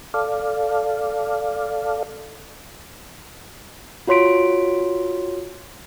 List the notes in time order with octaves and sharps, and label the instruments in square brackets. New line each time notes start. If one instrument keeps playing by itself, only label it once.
[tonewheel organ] A4 D5 F5
[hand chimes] F4 F#4 C#5 C6 B6 D7